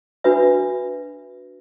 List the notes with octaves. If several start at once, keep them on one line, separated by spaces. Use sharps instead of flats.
D4 F#4 B4 E5